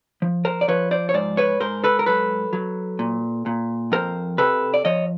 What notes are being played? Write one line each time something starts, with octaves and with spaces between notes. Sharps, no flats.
F3
A#4 C5
D5
F3 B4 C#5
C5 D5
C#5
G#2 C5 D5
B4 C#5
G#2 A#4 C5
A4 B4
A#4
F#3 A4 B4
F#3
A#2
A#2
F2 A#4 C5
C3 A4 B4
D5
F3 C#5 D#5